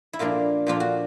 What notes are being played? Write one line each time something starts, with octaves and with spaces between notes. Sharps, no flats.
E4
A#2 F3 A#3 D4 F4
A#2 F3 A#3 D4 F4
F#4